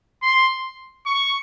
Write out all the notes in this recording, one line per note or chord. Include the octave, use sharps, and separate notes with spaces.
C6
C#6